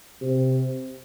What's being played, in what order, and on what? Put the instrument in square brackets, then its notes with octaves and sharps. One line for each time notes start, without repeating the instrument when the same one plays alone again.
[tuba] C3